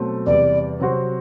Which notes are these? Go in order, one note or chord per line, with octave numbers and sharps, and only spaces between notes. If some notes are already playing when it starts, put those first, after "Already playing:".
Already playing: B2 F#3 A3 C4
E2 C3 G3 D5
C3 F#3 C4 F#4 C5